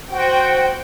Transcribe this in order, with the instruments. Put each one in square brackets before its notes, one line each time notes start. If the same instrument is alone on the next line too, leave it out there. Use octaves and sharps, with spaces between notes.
[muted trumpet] F#4 [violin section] C5 G5